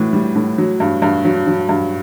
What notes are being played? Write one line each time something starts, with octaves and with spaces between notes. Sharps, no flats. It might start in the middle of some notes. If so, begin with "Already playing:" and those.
Already playing: A2 E3 F#4
G3
A2
F#3
G2
G2
F#3
F#3
G2